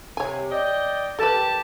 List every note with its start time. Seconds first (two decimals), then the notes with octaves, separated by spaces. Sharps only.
0.17 C3 C#5 G#5
0.51 D5 D#5 G5
1.19 D#3 G4 A4 B4 A5